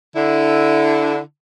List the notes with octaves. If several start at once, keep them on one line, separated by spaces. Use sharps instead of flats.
D3 E4